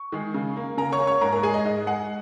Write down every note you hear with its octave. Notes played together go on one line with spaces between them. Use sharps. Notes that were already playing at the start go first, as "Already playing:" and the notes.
Already playing: C#6
D#3 G#3
C#3
A#3
C#3 A#4 A#5
C#5 C#6
A#3
C#5 C#6
G#2 A#4 A#5
A#4 A#5
G#3 G#4 G#5
D#5
G#2 D#5
G#3 F#5